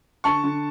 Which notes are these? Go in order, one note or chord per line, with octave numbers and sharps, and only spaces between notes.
D3 A5 C#6
D3